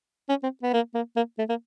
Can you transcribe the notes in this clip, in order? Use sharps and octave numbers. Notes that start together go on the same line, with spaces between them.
C#4
C4
B3
A#3
A#3
A#3
A3
A#3